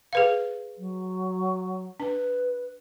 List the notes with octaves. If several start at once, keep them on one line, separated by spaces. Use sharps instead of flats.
G#4 B4 F5
F#3
D4 B4